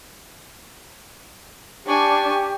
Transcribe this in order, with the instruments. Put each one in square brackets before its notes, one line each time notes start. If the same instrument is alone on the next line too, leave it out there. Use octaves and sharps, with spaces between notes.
[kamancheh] D4 [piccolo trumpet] G4 [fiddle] G#5 C#6